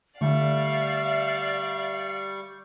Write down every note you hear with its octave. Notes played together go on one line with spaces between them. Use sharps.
D3 G3 A3 D5 E5 F5 C#6